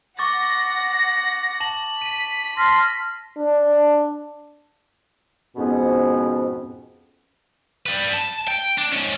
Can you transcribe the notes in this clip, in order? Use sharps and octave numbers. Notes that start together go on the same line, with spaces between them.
F#5 C#6 D6 A6 A#6
A5 F#7
B6 D#7
A5 C6 F6 A#6
D4
F2 G#2 B2 B3 C#4
G3 B4
A5
G5
D4
G#2 C#4